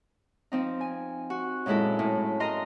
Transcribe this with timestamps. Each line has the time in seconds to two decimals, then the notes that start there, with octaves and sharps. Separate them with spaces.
0.52 F3 C4 D#4
0.81 G#5
1.30 F#4
1.66 F#2 A#2 G#3 E4 A4
1.99 A2
2.40 A#4 D#5 A#5 C6